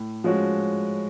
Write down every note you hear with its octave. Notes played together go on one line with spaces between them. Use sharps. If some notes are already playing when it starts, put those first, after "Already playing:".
Already playing: A2
F3 G#3 C#4 F#4